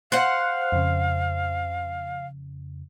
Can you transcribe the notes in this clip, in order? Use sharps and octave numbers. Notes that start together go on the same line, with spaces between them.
C5 F5 F#5 F#6
F2 C#3